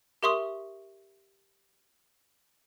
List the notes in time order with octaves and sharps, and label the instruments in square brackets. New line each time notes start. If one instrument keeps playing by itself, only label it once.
[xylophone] G4 A#4 E5 C6 C#6 D#6